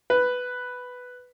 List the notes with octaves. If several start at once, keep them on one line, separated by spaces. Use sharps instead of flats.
B4